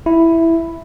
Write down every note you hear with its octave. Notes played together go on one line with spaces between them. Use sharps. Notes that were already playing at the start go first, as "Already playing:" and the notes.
E4